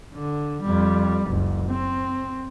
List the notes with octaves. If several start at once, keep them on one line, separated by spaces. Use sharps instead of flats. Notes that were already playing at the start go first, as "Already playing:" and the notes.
D3
F2 G3
F#1 C#2
C4